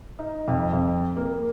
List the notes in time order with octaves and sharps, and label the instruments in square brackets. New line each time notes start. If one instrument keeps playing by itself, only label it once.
[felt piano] D#4
F2
F2
A#3